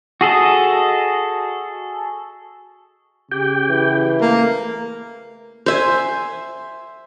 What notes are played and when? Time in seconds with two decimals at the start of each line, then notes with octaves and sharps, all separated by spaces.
0.21 F#4 G#4 A4 D#5
3.31 C#3 G4 G5
3.70 E3
4.21 A3 A#3
5.66 C5 E5 G#5